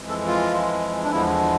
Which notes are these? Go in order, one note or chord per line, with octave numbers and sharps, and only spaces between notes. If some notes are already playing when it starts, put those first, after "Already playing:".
Already playing: F2 E3 G#3
A4
F4
D4
E2 D3 F3 G#3 E4